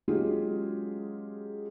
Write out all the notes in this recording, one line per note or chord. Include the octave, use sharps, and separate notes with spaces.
F#3 G#3 C#4 F4 G4 G#4